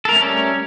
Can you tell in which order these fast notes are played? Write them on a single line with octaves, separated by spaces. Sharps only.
A4 A#4 A3 C#4 G3